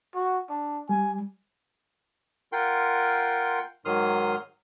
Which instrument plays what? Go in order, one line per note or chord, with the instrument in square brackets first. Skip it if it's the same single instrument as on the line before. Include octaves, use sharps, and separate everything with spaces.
[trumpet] F#4
D4
[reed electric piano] G3 [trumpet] G#5
[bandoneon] F4 A#4 F#5 G5 C6
G#2 D#3 F#3 C6 D#6 F6